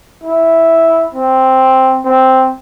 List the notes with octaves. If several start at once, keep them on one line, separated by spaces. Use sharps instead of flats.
E4
C4
C4